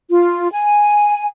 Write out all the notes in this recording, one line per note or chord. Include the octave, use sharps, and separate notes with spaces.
F4
G#5